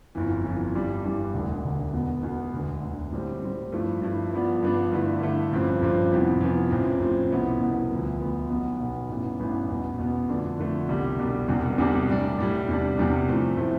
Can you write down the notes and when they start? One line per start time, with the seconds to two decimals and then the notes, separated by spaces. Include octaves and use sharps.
0.15 G1 F2 E3
0.44 G1 F2 E3
0.74 G2 E3 G3 D4
1.04 G2 E3 G3 D4
1.34 E1 D2 D3
1.64 E1 D2 D3
1.93 E2 B2 B3
2.23 E2 B2 B3
2.53 E1 D2 D3
2.83 E1 D2 D3
3.12 A2 G3 C4
3.42 A2 G3 C4
3.72 G2 F3 A3 E4
4.02 G2 F3 A3 E4
4.33 G2 F3 B3 D4
4.62 G2 F3 B3 D4
4.91 G2 D3 A3 E4
5.21 G2 D3 A3 E4
5.52 A1 G2 F3 C4
5.82 A1 G2 F3 C4
6.11 F2 C3 E3 B3
6.41 F2 C3 E3 B3
6.71 A1 A2 F3 C4
7.00 A1 A2 F3 C4
7.31 C2 B2 B3 E4
7.61 C2 B2 B3 E4
7.91 D2 D3 F3 B3
8.20 D2 D3 F3 B3
8.49 B1 B2 B3
8.80 B1 B2 B3
9.09 A1 G2 E3 B3
9.39 A1 G2 E3 B3
9.69 E2 B2 B3
9.99 E2 B2 B3
10.29 F2 D3 A3 D4
10.59 F2 D3 A3 D4
10.89 C2 B2 G3 D4
11.19 C2 B2 G3 D4
11.48 E1 E2 C3 G3 D4
11.78 E1 E2 C3 G3 D4
12.08 A2 G3 D4
12.38 A2 G3 D4
12.68 E2 C3 G3 D4
12.98 E2 C3 G3 D4
13.28 A2 F3 A3 C4 E4
13.57 A2 F3 A3 C4 E4